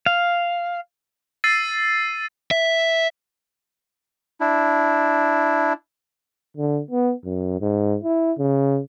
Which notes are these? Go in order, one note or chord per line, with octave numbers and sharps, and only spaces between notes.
F5
E6 A6 C7 D#7
E5
D4 E4
D3
B3
F#2
G#2
E4
C#3